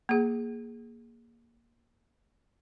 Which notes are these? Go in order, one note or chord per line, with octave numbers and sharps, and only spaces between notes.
A#3 G#4